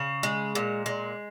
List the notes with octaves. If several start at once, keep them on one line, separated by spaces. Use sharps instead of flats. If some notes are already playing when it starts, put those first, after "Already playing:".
Already playing: C#3
G#3
A#2
G#3